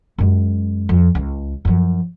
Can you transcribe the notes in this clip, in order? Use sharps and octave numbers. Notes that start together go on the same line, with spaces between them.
F#2 G#3
F2
C#2
F#2 F3